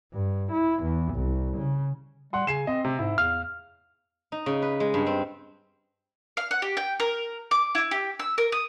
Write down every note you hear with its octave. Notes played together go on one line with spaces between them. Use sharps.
G2
E4
E2
C2
C#3
G3 F#5 C6
C#3 G#5 C7 E7
C4 D#5
C3
G#2 E4
E2 F5 F6
D#4
C#3
B4
G#3
G2
C4
F5
F#5
G4
G5
A#4
D6
E4
G4
E6
A#4
D#6